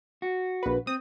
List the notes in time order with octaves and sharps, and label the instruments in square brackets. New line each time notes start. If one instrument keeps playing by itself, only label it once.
[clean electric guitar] F#4
[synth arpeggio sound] A#1 B4
[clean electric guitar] C4 [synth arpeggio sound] D#6